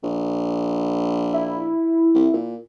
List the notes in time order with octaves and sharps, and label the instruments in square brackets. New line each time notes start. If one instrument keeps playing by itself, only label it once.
[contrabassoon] A#1
[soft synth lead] E4
[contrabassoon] C2
A#2